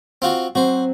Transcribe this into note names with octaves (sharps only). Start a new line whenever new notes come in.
C4 F4 F#4
F#3 C4 F#4 C5